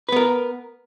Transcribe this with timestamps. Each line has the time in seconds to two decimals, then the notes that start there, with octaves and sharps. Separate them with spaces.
0.09 B4
0.12 B3
0.16 A#4